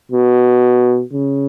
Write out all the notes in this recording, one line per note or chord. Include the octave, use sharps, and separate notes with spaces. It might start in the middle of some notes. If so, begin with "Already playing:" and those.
B2
C#3